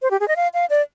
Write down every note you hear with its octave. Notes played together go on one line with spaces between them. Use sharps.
C5
G4
G#4
D#5
F5
F5
D5